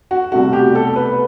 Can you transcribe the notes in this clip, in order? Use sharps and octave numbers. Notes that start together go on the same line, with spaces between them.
F#4
C2 B2 A3 F#4
G4
A4
B4